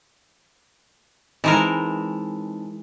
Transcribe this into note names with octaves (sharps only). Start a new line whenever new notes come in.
E3 G#3 C4 D#4 A#4 A5